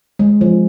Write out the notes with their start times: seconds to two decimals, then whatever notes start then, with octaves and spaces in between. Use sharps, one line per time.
0.19 G#3
0.41 F3